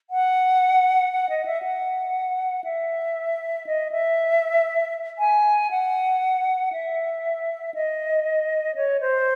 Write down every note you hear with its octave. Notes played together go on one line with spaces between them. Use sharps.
F#5
F#5
D#5
E5
F#5
E5
D#5
E5
G#5
F#5
E5
D#5
C#5
C5